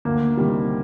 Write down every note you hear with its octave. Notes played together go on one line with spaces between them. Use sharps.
D2 A#3
C3 D#3 G3